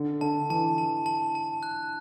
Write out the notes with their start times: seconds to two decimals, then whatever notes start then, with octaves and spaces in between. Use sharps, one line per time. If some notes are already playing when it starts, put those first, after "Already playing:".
Already playing: D3
0.21 D3 A5
0.50 E3 A5
0.78 A5
1.06 A5
1.35 A5
1.63 F#6